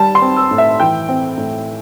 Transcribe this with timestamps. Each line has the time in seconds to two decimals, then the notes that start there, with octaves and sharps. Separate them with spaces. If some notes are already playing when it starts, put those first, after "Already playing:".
Already playing: G3 A5
0.15 C6
0.22 C4
0.37 E6
0.51 A2
0.58 E5
0.80 E3 G5
1.09 C4
1.38 A2